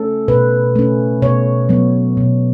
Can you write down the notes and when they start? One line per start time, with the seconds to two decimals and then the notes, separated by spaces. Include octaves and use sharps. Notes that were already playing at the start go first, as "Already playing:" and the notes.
Already playing: A3 C#4 A4
0.28 B2 B4
0.75 A3 C#4
1.22 B2 C#5
1.69 F#3 B3
2.17 B2